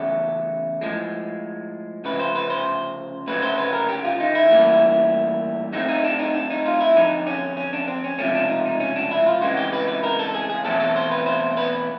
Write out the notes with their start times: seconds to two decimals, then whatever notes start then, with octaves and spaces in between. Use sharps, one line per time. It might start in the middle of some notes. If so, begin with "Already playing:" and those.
Already playing: E2 C#3 F#3 A3 G4
0.81 A2 F3 G#3
2.04 D2 C#3 F3 B4
2.20 C5
2.35 B4
2.50 C5
3.27 D2 C#3 F#3 A3 B4
3.42 C5
3.58 B4
3.73 A#4
3.89 G4
4.04 F4
4.20 D#4
4.35 E4
4.50 A2 E3 G3 A#3
5.73 A2 F#3 A3 C4 D#4
5.89 D#4
6.04 D4
6.19 D#4
6.34 D4
6.50 D#4
6.66 F4
6.74 D#4
6.81 E4
6.96 F2 D3 F#3 D#4
7.27 C#4
7.57 C#4
7.73 D4
7.88 C4
8.04 C#4
8.19 C#2 C3 F3 A3 C4 C#4
8.35 D4
8.50 D#4
8.65 D#4
8.80 C#4
8.96 D4
9.11 E4
9.26 F4
9.42 D2 C#3 E3 G#3 C4 F#4
9.57 G4
9.73 B4
9.88 B4
10.03 A#4
10.19 A4
10.34 G#4
10.50 G#4
10.65 E2 B2 F#3 A3 C4 A4
10.80 A4
10.96 C5
11.11 B4
11.26 C5
11.57 B4